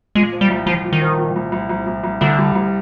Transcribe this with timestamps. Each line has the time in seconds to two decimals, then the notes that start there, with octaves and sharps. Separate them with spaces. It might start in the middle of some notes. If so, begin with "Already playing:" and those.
0.15 A#2 G#3
0.32 F3
0.41 G3
0.50 C2
0.66 C2 F3
0.84 A#2
0.93 D#3
1.02 F3
1.18 A#2
1.36 C2
1.52 C2
1.69 C2
1.86 C2
2.04 C2
2.21 C2 D3
2.38 G3
2.55 C2